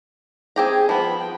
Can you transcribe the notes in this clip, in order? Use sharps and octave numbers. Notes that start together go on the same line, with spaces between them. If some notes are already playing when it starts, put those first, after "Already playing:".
C4 G4 G#4 A#5
F3 B3 B5
G5